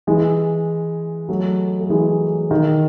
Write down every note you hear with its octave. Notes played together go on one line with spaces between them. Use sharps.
E3 G#3
F#3 A3
A3
E3 G#3
D#3